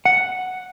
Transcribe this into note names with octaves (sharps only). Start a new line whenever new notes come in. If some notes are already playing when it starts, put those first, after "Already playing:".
F#5